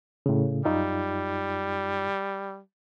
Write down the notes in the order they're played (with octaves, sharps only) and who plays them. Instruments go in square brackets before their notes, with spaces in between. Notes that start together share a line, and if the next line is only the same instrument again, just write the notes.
[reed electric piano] A2 C#3
[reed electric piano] F#2 D#4 F4 [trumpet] G3